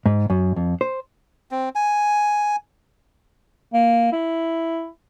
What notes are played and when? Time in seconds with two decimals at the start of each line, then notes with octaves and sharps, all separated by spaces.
0.06 G#2
0.30 F#2
0.56 F2
0.81 C5
1.51 C4
1.75 G#5
3.74 A#3
4.13 E4